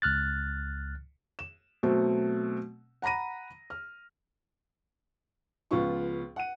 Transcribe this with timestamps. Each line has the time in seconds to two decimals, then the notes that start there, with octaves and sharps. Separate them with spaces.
0.02 C#2 F6 F#6 A6
1.39 E7
1.83 B2 F#3 A3 C4
3.02 F#5 A#5 B5 A#6 D#7
3.70 F6
5.71 C#2 F3 B3 F4 C#6
6.36 F#5 D#7